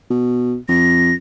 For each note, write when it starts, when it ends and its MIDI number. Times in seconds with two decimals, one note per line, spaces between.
0.10 0.56 47
0.69 1.12 41
0.69 1.15 94